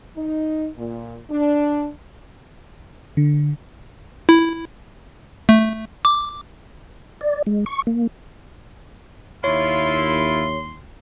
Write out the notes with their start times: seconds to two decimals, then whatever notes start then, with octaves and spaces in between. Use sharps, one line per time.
0.16 D#4
0.76 A#2
1.30 D4
3.17 D3
4.29 E4
5.49 A3
6.05 D6
7.21 D5
7.47 G#3
7.66 C#6
7.87 A#3
9.44 D#2 E4 F4 C#5 C6